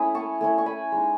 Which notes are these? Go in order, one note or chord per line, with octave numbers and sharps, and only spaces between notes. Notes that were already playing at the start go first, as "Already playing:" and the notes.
Already playing: A3 C#4 E4 B5 D#6
A5 C#6
A3 C#4 E4
C#6
G#5 B5
G#3 D#4